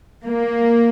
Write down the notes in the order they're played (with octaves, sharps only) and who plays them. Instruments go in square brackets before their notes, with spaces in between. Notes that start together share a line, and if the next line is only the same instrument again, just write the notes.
[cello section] A#3